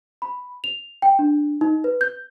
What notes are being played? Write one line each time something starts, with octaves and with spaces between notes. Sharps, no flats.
B5
F7
G5
D4
D#4
B4
G6